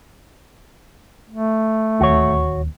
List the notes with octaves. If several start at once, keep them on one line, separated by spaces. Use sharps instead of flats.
A3
D1 D#2 F#4 C#5